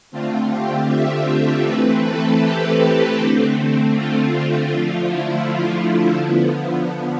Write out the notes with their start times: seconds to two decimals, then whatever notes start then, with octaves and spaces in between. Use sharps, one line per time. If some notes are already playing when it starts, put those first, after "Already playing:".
0.11 D3 A3 C4 F4
0.50 G4
0.88 E5
1.64 E3 A3 C4 B4
2.02 A4
2.40 G4
3.17 D3 A3 C4
3.93 F4
4.69 D3 F3 A3 F4
5.07 E4
6.22 D3 F3 B3